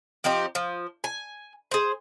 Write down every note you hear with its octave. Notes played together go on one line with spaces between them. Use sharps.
F3 C4 D#4 G4
F3
G#5
G#4 C5